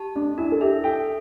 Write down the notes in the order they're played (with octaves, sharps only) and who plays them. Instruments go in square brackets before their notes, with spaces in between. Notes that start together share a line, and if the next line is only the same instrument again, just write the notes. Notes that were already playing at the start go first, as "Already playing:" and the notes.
Already playing: [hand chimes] G4 A5
[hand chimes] A3 [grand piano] D4
[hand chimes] D4 [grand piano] E4
[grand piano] A4
[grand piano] G4 [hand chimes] E5
[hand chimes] A4 [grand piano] G5